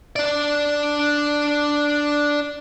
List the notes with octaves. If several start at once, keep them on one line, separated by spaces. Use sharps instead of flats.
D4 D5